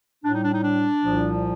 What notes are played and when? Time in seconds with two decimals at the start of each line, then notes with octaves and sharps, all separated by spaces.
0.24 A2 G3 D4
0.34 D#4
0.44 D4
0.54 D#4
0.64 D4
1.02 C2 A#2 F3